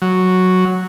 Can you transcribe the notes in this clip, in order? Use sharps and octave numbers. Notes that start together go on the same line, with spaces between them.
F#3